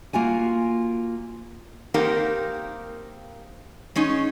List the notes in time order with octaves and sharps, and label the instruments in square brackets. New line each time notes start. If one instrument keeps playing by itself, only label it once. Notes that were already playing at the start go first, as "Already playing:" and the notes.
[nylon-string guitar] A#3 F4 F#4 G#5
[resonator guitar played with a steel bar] A#3 C4 D#4 G4 A#4 F5
G#3 C#4 D#4